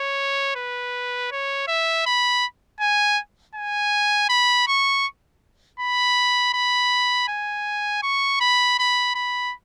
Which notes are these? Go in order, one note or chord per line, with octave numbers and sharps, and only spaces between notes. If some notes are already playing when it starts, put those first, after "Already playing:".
Already playing: C#5
B4
C#5
E5
B5
G#5
G#5
B5
C#6
B5
B5
G#5
C#6
B5
B5
B5